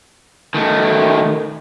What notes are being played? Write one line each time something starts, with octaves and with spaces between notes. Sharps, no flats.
D#3 A3